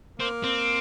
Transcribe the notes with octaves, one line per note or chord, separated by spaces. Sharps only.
A#3 C4
C4